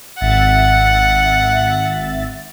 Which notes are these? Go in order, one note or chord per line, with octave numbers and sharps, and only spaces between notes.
G#1 E5 F#5 A6